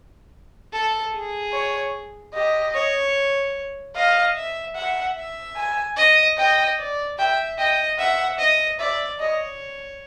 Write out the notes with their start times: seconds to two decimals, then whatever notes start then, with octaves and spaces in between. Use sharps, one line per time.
0.73 A4
1.14 G#4
1.53 C#5
2.34 G4 D#5
2.74 C#5
3.96 D#5 F5
4.36 E5
4.76 E5 F#5
5.16 E5
5.57 G#5
5.97 D#5
6.37 D#5 G5
6.78 D5
7.18 E5 G5
7.58 D#5 G5
7.99 E5 F#5
8.39 D#5
8.79 D5 E5
9.20 C#5 D#5